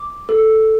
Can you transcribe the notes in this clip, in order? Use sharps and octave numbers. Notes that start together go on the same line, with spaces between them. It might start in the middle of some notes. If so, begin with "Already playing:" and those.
Already playing: D6
A4